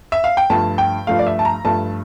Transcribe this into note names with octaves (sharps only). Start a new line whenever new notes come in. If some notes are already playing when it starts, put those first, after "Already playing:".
E5
F5
G5
G2 F3 A3 A5
G5
G2 F3 A3 F5
D5
E5
A5
A#5
G2 F3 A3 A5